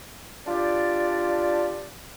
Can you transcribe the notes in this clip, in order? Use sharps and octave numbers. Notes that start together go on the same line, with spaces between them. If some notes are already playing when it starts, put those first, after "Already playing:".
D4 F4 G4 D5